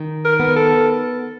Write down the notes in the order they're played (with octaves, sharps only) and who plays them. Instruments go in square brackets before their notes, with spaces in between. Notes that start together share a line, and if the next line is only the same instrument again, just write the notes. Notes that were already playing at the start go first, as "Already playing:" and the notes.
Already playing: [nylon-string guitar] D#3
[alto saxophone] A#4
[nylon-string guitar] B3
[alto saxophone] A4